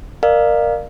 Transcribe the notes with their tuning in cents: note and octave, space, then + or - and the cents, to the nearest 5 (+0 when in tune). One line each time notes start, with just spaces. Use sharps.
A#4 +0 D5 +40 F5 +0